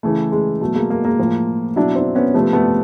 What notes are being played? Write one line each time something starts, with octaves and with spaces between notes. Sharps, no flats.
C#3 E3 A3
G#3
B2 F#3 A3
G#3 A#3
G#3 A#3
G#3 A#3
A2 F3
B2 F#3 D4 E4
C4 D4
B3 C#4
C3 F3 A3 B3
A3 B3